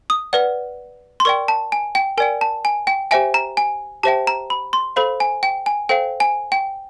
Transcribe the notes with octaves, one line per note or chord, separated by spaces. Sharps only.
D#6
B4 D5 F#5
C6
A#4 D5 G5 C#6
A5
G#5
G5
A#4 D5 G5 G#5
A5
G#5
G5
G4 C5 E5 G5 G#5
A#5
G#5
G4 C5 E5 G5 A5
A#5
B5
C6
A4 C5 F5 B5
G#5
G5
G#5
A4 C5 F5 G5
G#5
G5